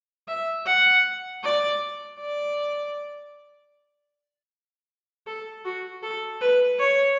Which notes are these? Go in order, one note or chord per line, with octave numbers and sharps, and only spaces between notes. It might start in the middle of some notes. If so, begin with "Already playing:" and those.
E5
F#5
D5
D5
A4
F#4
A4
B4
C#5